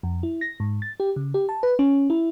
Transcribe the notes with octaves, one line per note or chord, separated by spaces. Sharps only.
F2
E4
A#6
G#2
A6
G4
C#3
G4
A5
B4
C#4
E4